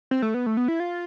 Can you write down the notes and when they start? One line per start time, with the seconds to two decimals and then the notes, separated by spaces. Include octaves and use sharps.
0.11 C4
0.22 A3
0.34 B3
0.46 A3
0.57 B3
0.68 E4
0.80 F4